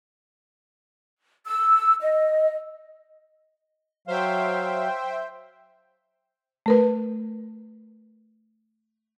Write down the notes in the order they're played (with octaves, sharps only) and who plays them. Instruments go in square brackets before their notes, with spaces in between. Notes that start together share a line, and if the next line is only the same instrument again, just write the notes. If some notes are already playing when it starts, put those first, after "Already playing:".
[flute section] E6
D#5
[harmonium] F#3 F5 [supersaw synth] C5 E5 G5
[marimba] A3 A#4 B4